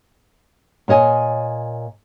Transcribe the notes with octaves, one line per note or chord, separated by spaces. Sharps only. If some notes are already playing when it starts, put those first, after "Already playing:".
A#2 C#5 D#5 G#5